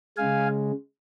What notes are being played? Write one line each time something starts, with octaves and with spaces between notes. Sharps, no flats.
C#3 G#3 F5 G#5